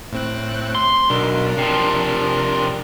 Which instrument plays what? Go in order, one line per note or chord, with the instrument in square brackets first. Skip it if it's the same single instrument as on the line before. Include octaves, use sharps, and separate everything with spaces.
[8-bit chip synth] A2 C4 F#6
[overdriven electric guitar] C6
[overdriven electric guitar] B1 [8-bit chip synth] D4 A#4
[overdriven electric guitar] C3 F3